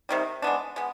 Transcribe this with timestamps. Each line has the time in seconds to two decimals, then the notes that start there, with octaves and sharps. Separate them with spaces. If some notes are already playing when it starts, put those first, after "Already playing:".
0.09 C3 D#3 G3
0.42 G#3 B3 D4
0.76 G#3 B3